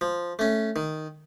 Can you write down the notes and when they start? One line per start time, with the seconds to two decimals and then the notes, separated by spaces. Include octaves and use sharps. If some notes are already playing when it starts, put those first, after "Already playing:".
0.01 F3
0.39 A3 C#4
0.76 D#3